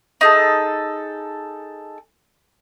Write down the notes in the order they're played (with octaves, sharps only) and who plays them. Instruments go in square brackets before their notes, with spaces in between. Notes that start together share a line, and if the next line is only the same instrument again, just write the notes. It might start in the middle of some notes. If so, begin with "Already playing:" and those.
[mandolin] D#4 G#4 A4